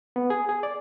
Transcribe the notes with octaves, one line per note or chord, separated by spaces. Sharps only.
B3
G#4
G#4
D5